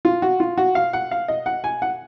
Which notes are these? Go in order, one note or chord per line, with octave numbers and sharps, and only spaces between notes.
F4
F#4
F4
F#4
F5
F#5
F5
D#5
F#5
G#5
F#5